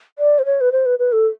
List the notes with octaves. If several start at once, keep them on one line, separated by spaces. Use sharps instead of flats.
D5
C5
C#5
B4
C5
B4
B4
A4